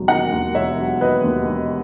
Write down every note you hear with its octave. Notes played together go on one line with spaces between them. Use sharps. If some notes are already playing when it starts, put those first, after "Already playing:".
Already playing: E1 D#2 F#3
D#3 F#5 A#5
D#2
E1 C#5 E5
F#3
D#3 B4 D#5
D#2
E1